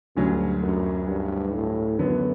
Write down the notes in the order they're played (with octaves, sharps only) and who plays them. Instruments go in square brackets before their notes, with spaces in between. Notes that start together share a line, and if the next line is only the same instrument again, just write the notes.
[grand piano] D2 D3 F#3 C#4 [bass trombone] G2
[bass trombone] F#2
G2
A2
[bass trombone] F#2 [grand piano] D3 F#3 B3